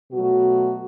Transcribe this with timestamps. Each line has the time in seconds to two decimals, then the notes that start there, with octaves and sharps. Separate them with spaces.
0.11 B2 F#3 A3 F#4